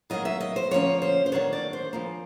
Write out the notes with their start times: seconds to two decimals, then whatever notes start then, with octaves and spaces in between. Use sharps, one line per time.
0.10 D#3 F#3 A#3 D#5
0.25 E5
0.41 D#5
0.56 C5
0.71 D3 F3 A#3 C#4 C#5
1.02 C5
1.26 C5
1.32 D#3 F#3 A#3 D4 C#5
1.53 D5
1.73 C5
1.93 C#3 F3 A#3